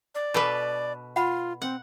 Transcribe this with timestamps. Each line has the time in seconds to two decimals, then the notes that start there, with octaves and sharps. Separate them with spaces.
0.15 D5
0.34 B2 D4 A4 B4 D6
1.16 F4 F#5 B5
1.62 C4 F#5